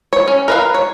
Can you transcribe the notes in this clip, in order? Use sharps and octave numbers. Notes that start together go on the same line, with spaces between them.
C#5
C#4
A#4 B4 F5
C#5